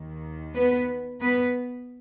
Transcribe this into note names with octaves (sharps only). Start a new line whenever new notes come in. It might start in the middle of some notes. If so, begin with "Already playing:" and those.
Already playing: D#2 D#3
B3 B4
B3 B4